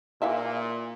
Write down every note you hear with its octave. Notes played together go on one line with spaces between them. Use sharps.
A#2 E3 E4 E5